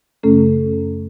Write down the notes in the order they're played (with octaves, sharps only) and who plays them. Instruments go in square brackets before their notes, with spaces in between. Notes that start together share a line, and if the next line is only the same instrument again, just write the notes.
[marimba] F#2 C#3 A3 C#4 A4